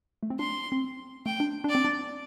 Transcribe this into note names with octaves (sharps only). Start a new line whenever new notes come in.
A3
C4
D4 C6
C4
A3 G5
D4
D4 D5
C4
D4